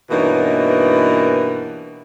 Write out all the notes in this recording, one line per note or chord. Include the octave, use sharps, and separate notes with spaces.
G2 B2 E3 A#3 C#4 D#4